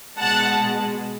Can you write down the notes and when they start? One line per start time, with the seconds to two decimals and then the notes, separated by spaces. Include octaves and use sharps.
0.19 B2 G#3 F#5 A5